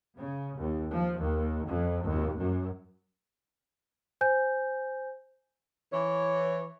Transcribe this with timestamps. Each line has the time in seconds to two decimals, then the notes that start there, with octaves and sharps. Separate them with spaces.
0.16 C#3
0.56 D#2
0.91 F3
1.21 D#2
1.66 F2
2.06 D#2
2.39 F#2
4.21 C5 G#5 G6
5.93 E3 C#5